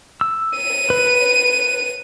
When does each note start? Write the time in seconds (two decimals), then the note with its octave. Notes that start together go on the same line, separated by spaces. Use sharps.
0.21 E6
0.57 D#7
0.90 B4